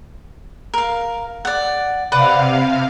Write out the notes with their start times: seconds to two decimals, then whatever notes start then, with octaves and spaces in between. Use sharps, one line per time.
0.74 A#4 F5
1.45 D5 F#5
2.12 C3 B4 D5 F5 F#5